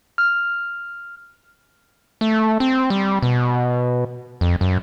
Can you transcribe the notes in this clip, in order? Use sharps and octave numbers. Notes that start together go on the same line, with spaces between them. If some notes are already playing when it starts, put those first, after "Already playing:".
F6
A3
C4
G3
B2
F2
F#2